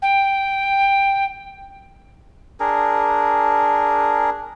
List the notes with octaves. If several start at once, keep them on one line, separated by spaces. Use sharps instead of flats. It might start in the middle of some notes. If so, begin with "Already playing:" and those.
G5
D4 G#4 A#4